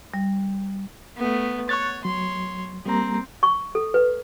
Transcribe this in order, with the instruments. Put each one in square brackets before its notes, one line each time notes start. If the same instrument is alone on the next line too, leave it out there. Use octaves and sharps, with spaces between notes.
[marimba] G3
[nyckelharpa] A3 B3
[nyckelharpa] C#5 [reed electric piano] C#6 F#6 A6
[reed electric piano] F#3 [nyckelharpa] C#5 C6
[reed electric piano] G3 A#3 A#5 [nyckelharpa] C4
[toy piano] C#6
A4
B4